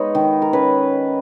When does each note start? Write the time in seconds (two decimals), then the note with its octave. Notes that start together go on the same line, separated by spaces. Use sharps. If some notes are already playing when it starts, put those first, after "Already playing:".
Already playing: G#3 B3 D#4 C#5 D#5
0.15 D#3
0.42 A#4
0.53 C#4 B4